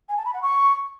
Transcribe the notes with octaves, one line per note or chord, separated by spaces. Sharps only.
G#5
A5
B5
F#5
C#6